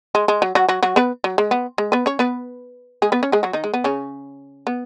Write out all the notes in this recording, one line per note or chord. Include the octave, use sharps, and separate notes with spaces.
G#3
G#3
F#3
F#3 F#4
F#3 F#4
F#3 F#4
B3 B4
F#3
G#3
B3
G#3
B3 B4
C#4 C#5
B3 B4
G#3 G#4
B3 B4
C#4 C#5
G#3 G#4
F#3 F#4
D#3 D#4
G#3
B3
C#3 C#4
B3